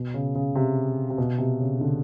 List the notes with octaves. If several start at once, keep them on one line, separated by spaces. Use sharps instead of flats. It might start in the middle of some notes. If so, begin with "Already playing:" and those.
Already playing: B2
C#3
C#3
C3
C3
B2
C3
C#3
D3